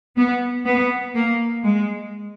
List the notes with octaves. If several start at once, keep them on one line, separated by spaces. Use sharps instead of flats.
B3
B3
A#3
G#3